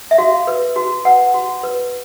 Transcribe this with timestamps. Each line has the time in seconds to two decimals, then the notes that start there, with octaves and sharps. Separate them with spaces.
0.11 E5
0.18 F#4 F5
0.47 B4
0.76 F#4
1.05 B4 F#5
1.34 F#4
1.63 B4